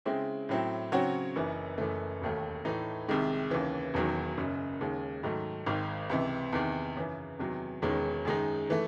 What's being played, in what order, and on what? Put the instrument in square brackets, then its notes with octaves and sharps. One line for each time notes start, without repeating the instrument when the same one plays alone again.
[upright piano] C#3 G#3 C4 E4
A2 F#3 C4 E4
C#3 F#3 C4 F#4 C#5
F#1 F#2 E3
F#1 F#2 E3 A3
E1 D#2 D#3 A3
A2 E3 A3 D#4
C2 C3 D#3 G#3
D#2 C#3 E3
E1 E2 D#3 F#3
F#1 F#2 C#3
D#2 C#3 G#3
G#2 D#3 F#3 A3
G#1 G#2 D#3
C#2 C3 E3
E2 C3 D#3
F#2 C#3 E3
E2 C3 D#3 F#3
E1 E2 D#3 G#3 C#4
F#2 D#3 G#3 D#4
E3 A3